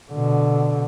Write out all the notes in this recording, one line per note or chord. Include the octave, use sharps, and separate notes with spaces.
B2 D3